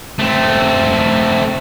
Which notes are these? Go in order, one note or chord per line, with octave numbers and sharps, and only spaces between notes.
A3 C4